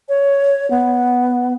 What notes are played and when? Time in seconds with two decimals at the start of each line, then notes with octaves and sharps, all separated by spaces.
0.09 C#5
0.70 B3